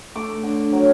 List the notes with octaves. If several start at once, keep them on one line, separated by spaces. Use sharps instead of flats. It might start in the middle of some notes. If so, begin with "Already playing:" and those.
A3 D6
D3
F#3